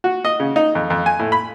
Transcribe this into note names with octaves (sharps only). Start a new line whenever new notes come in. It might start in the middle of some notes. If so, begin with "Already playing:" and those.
F#4
D#5
C#3
D#4
F2
F2
G#5
A2
B5